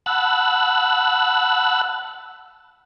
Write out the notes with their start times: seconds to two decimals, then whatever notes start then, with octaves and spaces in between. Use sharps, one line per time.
0.06 F#5 A5 B5 E6 F#6